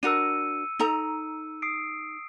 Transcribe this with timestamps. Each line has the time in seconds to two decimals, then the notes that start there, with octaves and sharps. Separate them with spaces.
0.03 D4 F#4 A#4 E6 C#7 D#7
0.79 D#4 A4 A#5
1.62 D#6 C7 D7